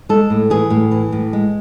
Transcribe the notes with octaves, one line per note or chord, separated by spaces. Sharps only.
G#3 A4
A2
E3 G#4
A2
E3
A2
G#3